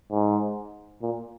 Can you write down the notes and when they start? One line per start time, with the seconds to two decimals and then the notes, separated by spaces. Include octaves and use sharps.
0.12 G#2
1.01 A#2